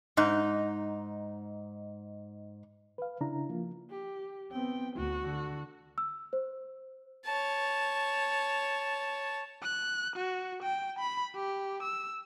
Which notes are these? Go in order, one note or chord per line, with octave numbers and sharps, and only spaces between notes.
G#2 D#4
B4 F5
C#3 D4 E4 A#5
F3 A#3 F4
G4
B3 C4 G5
D2 F#4
D3
E6
C5
C#5 A5
F#6
F#4
G5
B5
G4
E6